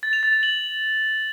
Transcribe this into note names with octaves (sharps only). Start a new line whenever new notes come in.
A6
F7
A6
F7
F#7